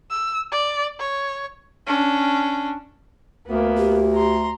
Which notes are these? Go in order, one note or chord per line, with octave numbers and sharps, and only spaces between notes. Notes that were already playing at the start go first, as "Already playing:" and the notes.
E6
D5
C#5
C#4 D4
D2 A#3 B3
G4
A#5 C6